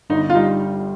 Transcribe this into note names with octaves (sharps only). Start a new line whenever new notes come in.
G1 D#4
F4
G3 D#4